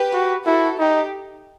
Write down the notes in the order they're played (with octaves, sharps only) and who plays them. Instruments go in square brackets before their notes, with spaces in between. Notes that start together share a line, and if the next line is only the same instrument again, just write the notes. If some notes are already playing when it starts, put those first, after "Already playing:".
Already playing: [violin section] G4 B4
[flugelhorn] F#4
[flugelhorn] E4 [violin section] F#4 A4
[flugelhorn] D#4 [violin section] G4